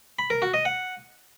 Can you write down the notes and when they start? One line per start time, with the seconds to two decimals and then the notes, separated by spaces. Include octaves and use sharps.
0.19 B5
0.30 A#4
0.42 F#4
0.54 D#5
0.65 F#5